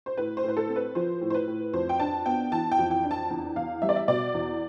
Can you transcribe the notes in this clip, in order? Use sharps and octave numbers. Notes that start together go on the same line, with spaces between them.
C5
A2 B4
C5
A2 B4
A4
C4
B4
F3 C5
A2
C5
B4
A2
F2 C5
G5
D4 A5
B3 G5
E3 A5
G5
F2
G5
D4
A5
E2
E2 F5
G3 E5
D5
E5
B2 D5
E2